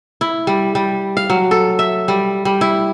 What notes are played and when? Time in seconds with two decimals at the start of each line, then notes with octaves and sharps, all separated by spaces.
0.21 E4
0.47 G3
0.75 G3
1.17 F5
1.30 F#3
1.51 A4
1.79 E5
2.08 G3
2.45 G3
2.61 E4